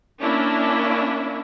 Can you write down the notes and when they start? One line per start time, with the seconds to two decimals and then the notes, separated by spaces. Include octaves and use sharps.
0.21 A#3 C#4 D4 E4